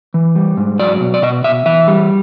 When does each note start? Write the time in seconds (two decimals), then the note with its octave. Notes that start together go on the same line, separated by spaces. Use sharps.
0.14 E3
0.36 G3
0.57 G#2
0.79 F#3 D5
1.01 B2
1.14 D5
1.22 B2 D#5
1.44 B2 E5
1.66 E3 E5
1.88 G3